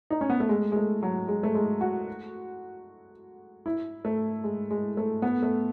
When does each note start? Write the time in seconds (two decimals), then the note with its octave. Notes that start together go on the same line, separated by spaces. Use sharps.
0.10 D#4
0.21 C#4
0.30 B3
0.40 A3
0.49 G#3
0.72 G#3
0.76 A3
1.03 F#3
1.28 G#3
1.43 A3
1.55 G#3
1.81 F#4
3.66 E4
4.05 A3
4.44 G#3
4.71 G#3
4.97 A3
5.22 B3
5.43 A3